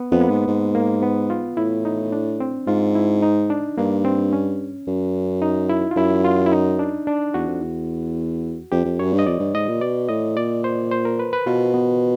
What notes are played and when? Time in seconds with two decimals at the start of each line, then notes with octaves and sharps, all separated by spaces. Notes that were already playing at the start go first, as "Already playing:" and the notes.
Already playing: B3
0.12 F2 B3
0.20 A#3
0.30 G#2
0.48 G#2
0.75 A#3
1.03 B3
1.30 F4
1.57 A2 E4
1.85 D#4
2.12 D4
2.40 C4
2.67 G#2 F4
2.95 E4
3.22 D#4
3.50 D4
3.78 G2 A#3
4.05 C4
4.33 C#4
4.87 F#2
5.42 D#4
5.69 E4
5.91 F4
5.96 F#2 E4
6.25 F4
6.46 E4
6.52 D#4
6.79 D4
7.07 D4
7.34 E2 F#4
7.48 F2
7.61 E2
8.72 F2 G4
8.85 F2
8.99 F#2 C#5
9.13 G2
9.19 D#5
9.26 F2 D5
9.40 G2
9.55 G#2 D#5
9.68 A#2
9.81 B2 D5
10.09 A2 D#5
10.37 A#2 D5
10.64 C5
10.91 C5
11.05 A#4
11.19 B4
11.33 B4
11.47 B2 F4
11.74 B3